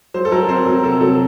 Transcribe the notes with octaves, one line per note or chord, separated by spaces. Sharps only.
F#3 C5
A4
F#3 A#4
C4 C5
F#3 A#4
C3 A4
F#3 A4